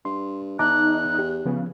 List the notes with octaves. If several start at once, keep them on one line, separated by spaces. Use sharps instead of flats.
G2 C6
E2 D#4 A5 A#5 D6 F#6
G4
C#3 F3 B3